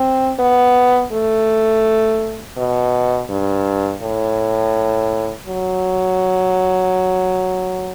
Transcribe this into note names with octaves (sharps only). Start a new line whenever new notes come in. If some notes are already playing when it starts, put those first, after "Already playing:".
Already playing: C4
B3
A3
B2
G2
A2
F#3